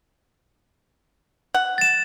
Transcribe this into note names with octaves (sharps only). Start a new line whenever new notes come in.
F#5
A6 E7